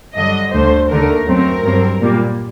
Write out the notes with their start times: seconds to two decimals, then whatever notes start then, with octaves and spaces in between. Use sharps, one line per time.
0.15 G2 D3 F#3 D#5
0.52 D2 D3 A3 C5
0.89 D#2 D3 A3 A#4
1.27 F#2 F#3 A3 C4 A#4
1.63 G2 F#3 C4
2.00 A#2 G3 A#3